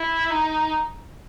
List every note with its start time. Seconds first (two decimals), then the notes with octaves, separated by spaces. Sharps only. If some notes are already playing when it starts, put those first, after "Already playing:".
Already playing: E4
0.30 D#4